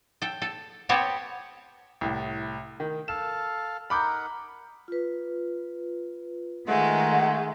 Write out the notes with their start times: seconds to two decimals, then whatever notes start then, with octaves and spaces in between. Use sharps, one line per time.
0.22 A4 G5
0.42 A4
0.89 B3 C4 G4 C#5 A5
2.01 C2 A2
2.80 D#3
3.08 A4 F5 E7
3.90 D#4 A#4 F#5 B5 D6 G6
4.88 F4 B4
6.68 D#3 G#3 A3 F#5